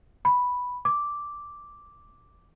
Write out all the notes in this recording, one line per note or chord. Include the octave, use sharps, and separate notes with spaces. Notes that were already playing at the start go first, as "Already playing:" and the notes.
B5
D6